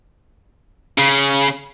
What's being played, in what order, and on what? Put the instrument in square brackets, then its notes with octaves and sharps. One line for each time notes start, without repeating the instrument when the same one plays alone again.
[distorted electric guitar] C#3